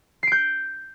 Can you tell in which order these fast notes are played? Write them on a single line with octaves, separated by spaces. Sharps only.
C7 D7 G6